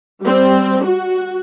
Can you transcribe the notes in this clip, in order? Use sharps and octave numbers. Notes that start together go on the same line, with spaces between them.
G3 C4
F#4